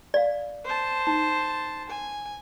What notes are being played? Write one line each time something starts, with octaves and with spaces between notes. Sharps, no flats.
D5 F5
C5 A5
D#4
G#5